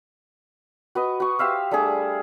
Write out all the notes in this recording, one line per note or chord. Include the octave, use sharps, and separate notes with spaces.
F#4 B4 D#5
F#4 C#6
G4 C5 E5 F5
G3 A3 D4 G#4